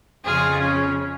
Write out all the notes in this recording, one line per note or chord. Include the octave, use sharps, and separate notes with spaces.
F2 C#3 F3 F4 G#4
C#4